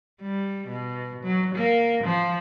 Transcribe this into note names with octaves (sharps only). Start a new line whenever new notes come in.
G3
B2
F#3
A#3
F3